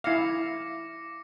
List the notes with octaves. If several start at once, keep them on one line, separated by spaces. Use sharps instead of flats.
E4 F5 D6 A#6 C#7